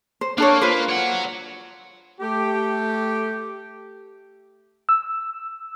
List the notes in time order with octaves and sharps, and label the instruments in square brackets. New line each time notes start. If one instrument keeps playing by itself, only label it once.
[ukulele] C5
[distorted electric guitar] A#3 [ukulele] D4 A4 C#5
[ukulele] F4 B4 C5
[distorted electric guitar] C#5 F#5
[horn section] A3 G4
[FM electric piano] E6